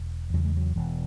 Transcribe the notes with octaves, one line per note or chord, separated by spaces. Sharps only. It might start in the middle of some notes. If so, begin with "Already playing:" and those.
Already playing: E1
E2 C#3 F#3
G#3
F#3
E1 E3